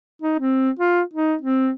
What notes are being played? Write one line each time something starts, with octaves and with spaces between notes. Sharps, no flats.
D#4
C4
F4
D#4
C4